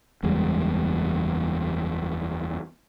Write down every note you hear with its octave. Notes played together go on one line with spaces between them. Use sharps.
F#1 E2 G3 G#3